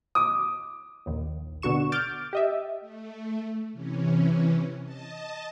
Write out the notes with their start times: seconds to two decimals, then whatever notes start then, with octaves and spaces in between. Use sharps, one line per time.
0.15 D6 D#6
1.06 A#1 D#2
1.62 B2 D3 F#4 C#6 E7
1.92 D6 F6 G6 A6 D7
2.33 G4 D#5 E5
2.80 A3
3.72 C3 E3 C#4
4.84 D#5 A5